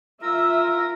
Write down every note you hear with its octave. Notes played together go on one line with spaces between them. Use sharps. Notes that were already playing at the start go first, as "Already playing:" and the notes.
F4 A#4 E5 E6